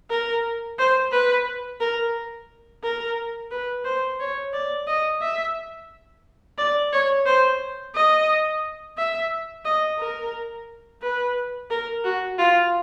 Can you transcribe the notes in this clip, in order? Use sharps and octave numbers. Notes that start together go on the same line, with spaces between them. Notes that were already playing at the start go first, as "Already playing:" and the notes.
A#4
C5
B4
A#4
A#4
B4
C5
C#5
D5
D#5
E5
D5
C#5
C5
D#5
E5
D#5
A#4
B4
A#4
F#4
F4